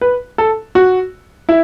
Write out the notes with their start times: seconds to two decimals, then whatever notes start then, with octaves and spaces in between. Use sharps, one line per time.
0.01 B4
0.38 A4
0.75 F#4
1.49 E4